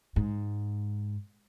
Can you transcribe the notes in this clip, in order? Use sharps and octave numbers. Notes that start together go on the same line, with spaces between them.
G#2